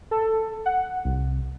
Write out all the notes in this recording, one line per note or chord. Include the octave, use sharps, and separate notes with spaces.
A4
F#5
C2